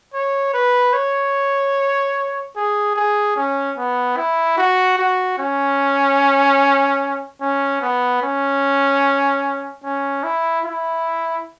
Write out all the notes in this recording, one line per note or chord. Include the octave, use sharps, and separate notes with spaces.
C#5
B4
C#5
G#4
G#4
C#4
B3
E4
F#4
F#4
C#4
C#4
B3
C#4
C#4
E4
E4